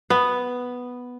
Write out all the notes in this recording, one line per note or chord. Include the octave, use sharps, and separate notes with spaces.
B3